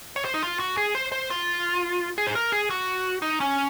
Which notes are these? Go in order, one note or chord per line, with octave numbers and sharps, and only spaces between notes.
C#5
C5
D#4
F4
F#4
G#4
C5
C5
F4
G#4
C5
A#4
G#4
F#4
D#4
C#4